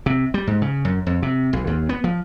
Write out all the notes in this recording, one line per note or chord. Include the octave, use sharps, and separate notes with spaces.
C3
G3
G#2
C#3
F#2
F2
C3
B1
D#2
B3
F3